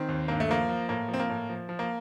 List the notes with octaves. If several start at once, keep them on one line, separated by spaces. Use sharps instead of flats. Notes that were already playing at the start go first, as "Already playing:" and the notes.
Already playing: D#3 C4
D#2
G2 A#3
A3
F3 A#3
F3
A2 A#3
F3
C4
A#3
A2
F3
F3
A#3